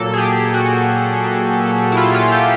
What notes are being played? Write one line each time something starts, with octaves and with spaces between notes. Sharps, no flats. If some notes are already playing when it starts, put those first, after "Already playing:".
Already playing: A#2 F#3 A#3 A4
G#4
G4
F#4
E4
F4
F4
G4